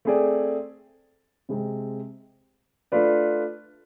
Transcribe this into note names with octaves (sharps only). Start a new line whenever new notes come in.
A3 C4 G#4 D5
C3 G#3 C4
A3 D4 F4 B4 D5